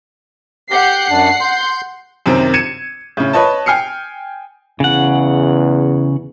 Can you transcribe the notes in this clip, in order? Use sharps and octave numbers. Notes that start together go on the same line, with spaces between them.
G4 F#5 G6 C7
F#2 D4
C6 G6
F#2 C3 D#3 C4
G#6 C#7 D#7 E7
A2 C#3
B4 C#5 D#5 A5
G5 G#5 F6 C7 C#7
E2 C#3 F#5